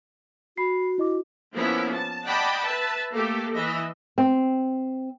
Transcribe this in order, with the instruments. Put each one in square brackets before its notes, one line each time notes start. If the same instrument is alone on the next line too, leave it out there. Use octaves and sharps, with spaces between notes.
[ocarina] F#4 [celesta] B5 C7
[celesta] E4 D#5 D6
[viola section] F3 A#3 B3 C#4 E4
A5
D5 D#5 F#5 G5 A5 B5
B4 E5 A5
A3 A#3 G4 A4
E3 D#5 E5
[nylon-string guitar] C4